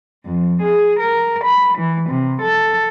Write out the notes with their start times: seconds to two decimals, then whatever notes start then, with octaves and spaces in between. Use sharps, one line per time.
0.25 F2
0.62 G#4
1.00 A#4
1.44 B5
1.78 E3
2.10 C3
2.42 A4